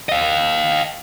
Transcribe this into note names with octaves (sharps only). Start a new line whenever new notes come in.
D#5 F5